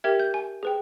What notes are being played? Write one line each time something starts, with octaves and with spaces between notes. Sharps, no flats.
G4 A#4 E5 G5 G#6
G6
G#5
G#4 B4 G5